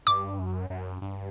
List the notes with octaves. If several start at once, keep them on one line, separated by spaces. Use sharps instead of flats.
G2 D6
F#2
F#2
G2